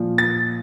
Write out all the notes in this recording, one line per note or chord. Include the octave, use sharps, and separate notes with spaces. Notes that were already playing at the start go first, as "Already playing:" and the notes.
Already playing: A#2 F3
A6